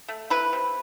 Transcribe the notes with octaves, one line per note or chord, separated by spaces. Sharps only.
A3
E4 B4
C3